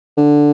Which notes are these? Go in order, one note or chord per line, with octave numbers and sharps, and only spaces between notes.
D3